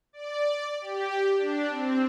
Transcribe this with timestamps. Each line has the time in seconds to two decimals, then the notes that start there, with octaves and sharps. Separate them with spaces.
0.13 D5
0.81 G4
1.37 D4
1.70 C4